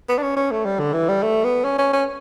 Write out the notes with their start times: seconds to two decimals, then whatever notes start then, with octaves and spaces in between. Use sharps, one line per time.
0.09 B3
0.18 D4
0.22 C#4
0.36 C#4
0.51 A3
0.65 G3
0.79 D3
0.93 E3
1.08 G3
1.23 A3
1.44 B3
1.64 C#4
1.78 C#4
1.93 C#4